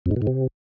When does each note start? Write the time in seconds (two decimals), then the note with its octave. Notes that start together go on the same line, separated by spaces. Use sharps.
0.06 F2
0.11 G#2
0.16 B2
0.22 G#2
0.27 C3